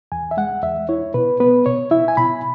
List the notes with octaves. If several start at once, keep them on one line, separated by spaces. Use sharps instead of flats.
E2 G#5
E5
G#3 F#5
E2 E5
E4 C#5
B2 B4
B3 B4
B2 C#5
E4 E5
G#5
B2 B5